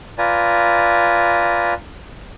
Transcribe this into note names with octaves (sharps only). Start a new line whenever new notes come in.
F4 B4 D5 G#5 A#5